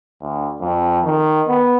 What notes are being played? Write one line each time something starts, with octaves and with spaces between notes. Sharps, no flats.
D2
F2
D#3
B3